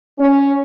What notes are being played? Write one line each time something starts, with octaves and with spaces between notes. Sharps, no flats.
C#4